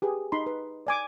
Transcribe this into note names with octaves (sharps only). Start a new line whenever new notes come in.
G4 G#4 B4
D#4 B5 C6
B4
D5 G#5 D6